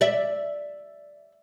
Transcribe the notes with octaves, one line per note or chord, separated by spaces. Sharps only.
D5 E5